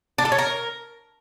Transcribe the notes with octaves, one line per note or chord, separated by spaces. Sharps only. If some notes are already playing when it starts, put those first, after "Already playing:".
D4
A4
C#5
A#4